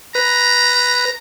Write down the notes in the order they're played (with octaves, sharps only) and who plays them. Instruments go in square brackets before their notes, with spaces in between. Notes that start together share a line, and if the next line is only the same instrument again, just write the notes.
[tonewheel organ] B4 [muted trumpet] A#5